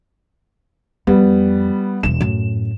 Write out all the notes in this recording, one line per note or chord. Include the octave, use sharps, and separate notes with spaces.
F2 G3 B3
E1 E3 E7
F#2 A2